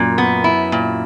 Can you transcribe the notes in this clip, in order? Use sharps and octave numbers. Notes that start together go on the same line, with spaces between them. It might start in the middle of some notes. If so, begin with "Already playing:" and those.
Already playing: F#2 A#2
B3
E4
A#2